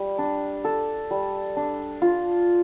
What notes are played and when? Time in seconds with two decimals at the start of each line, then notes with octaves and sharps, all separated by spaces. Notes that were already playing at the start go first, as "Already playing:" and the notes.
Already playing: G3
0.18 D4
0.64 A4
1.11 G3
1.57 D4
2.02 F4